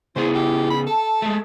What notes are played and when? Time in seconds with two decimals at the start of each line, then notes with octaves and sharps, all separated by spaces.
0.16 C#3 B3 E4 G#4 C5
0.35 G4
0.70 B5
0.87 A4 A5
1.22 G#3 A3